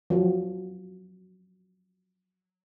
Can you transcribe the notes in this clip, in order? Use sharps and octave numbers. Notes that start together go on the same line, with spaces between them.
F3 F#3